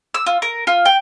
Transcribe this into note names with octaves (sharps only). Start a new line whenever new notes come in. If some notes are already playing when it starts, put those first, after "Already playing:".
E6
F4
A#4
F4
G5